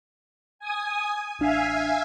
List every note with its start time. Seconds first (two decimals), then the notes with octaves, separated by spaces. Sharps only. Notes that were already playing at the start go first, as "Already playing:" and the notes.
0.59 G#5 D#6
1.39 A1 D4 E5 F5 G#5 C7